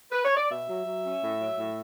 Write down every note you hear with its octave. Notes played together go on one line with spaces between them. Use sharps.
B4
C#5
D5
B2 E5
F#3
F#3
C#4
A2
F#3
A2